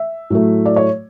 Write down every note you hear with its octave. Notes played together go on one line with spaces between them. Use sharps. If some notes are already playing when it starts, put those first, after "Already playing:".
Already playing: E5
A2 F#3 A3
D5
C#5